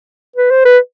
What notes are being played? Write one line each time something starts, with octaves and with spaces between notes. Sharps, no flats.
B4
C5
B4